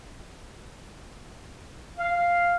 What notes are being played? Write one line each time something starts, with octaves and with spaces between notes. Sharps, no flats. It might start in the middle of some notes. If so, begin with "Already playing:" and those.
F5